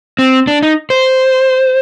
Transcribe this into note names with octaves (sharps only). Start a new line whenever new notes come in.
C4
D4
D#4
C5